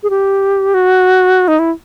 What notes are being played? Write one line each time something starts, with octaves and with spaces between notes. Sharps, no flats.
G#4
G4
F#4
D#4
E4